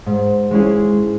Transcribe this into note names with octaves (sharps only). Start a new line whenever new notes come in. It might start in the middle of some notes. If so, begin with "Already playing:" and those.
G#2
G#3 C#4 E4 G#4